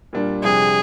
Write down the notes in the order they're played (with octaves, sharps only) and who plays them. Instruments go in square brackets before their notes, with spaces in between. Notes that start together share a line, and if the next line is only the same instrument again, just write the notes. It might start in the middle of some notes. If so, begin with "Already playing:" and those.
[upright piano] A#2 G3 D4 F4
[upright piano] F2 C3 G3 D4 [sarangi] G#4